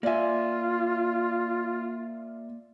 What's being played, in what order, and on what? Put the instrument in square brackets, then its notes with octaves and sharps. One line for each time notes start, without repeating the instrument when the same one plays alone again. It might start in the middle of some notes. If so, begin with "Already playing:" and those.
[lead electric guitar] A#3 G#5 [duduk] F4 [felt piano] D5 E5